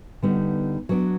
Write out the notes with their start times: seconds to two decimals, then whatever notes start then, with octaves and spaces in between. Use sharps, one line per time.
0.22 D3 G3 B3 D#4
0.89 F#3 B3 D4